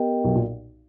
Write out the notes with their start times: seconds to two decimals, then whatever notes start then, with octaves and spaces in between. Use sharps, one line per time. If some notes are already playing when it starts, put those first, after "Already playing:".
Already playing: B3 G4 A#4 D#5 G5
0.24 B1 B2
0.35 A#2